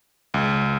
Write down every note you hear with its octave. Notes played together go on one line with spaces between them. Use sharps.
C#2